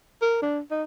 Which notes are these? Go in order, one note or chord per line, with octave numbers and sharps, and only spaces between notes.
A#4
D4
D#4